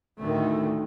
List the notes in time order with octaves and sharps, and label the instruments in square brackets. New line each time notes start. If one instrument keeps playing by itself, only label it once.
[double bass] D2 A2 [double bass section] D3 D#3 A3